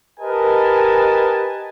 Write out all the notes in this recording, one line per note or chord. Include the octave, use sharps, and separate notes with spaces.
G4 A#4 B4 D#5 G#5 A5